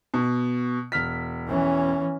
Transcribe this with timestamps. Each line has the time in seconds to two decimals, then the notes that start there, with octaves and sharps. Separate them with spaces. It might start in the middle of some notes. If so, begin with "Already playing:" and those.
0.14 B2
0.92 E1 F6 B6
1.48 E3 C#4